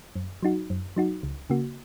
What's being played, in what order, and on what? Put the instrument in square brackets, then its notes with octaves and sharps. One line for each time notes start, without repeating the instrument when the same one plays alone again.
[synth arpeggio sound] F#2
F#3 D#4 F#4
F#2
F#3 D#4 F#4
C#2
C#3 A#3 F#4